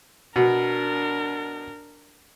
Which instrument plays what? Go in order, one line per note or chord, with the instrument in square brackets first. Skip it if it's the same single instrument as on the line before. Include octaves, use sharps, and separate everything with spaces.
[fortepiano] B2 [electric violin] D4 A#4